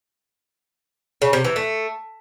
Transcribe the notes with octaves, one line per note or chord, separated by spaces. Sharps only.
C#3
C3
E3
A3